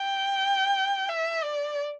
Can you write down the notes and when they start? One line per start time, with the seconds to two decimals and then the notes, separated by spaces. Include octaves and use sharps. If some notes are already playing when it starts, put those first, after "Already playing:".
Already playing: G5
1.09 E5
1.43 D5